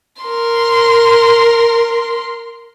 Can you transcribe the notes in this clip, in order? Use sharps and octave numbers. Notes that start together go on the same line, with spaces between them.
A#4 C6